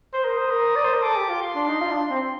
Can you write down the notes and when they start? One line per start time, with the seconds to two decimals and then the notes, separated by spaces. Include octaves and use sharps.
0.13 C5
0.24 A#4 D#6
0.37 C5
0.51 A#4
0.75 D5
0.84 C5
0.93 A#4
1.02 A4 D6
1.16 G4
1.29 F4
1.42 C6
1.55 D4
1.68 D#4
1.81 F4
1.91 D4
2.10 C4